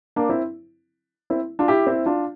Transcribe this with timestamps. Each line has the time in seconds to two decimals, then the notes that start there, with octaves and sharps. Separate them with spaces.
0.16 A#3 D4
0.29 C4 E4
1.30 C4 E4
1.59 D4 F4
1.68 E4 G4
1.87 C4 E4
2.06 D4 F4